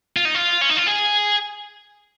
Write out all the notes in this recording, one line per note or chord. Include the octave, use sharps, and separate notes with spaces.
F4
D#4
F4
C#4
D#4
F4
G#4